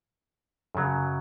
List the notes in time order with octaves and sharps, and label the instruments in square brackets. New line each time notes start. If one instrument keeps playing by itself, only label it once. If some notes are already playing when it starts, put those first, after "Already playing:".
[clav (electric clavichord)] F#2 C#3 F#3